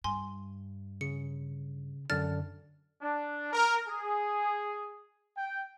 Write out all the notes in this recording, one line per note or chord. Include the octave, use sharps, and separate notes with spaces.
G2 G#5 C6
C#3 C#7
F#2 D3 D4 F6 A6
D4
A#4
G#4
G5